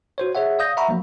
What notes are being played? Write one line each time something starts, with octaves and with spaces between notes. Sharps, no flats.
F#4 C5 C#5
G#4 C#5 E5 F#5
D5 F5 D#6 G6 A#6
E5 F#5 A#5 B5 C#6
F3 F#3 A#3